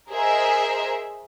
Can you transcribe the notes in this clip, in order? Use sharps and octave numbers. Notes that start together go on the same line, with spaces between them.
G#4 A#4 C5 D#5 E5